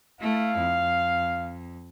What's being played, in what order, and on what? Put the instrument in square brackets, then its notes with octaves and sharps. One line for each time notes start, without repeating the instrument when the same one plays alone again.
[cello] A3 E4 [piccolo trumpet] F5
[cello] F2